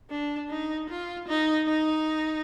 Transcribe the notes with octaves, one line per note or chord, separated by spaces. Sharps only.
D4
D#4
F4
D#4
D#4